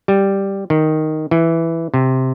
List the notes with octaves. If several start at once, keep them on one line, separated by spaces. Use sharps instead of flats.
G3
D#3
E3
C3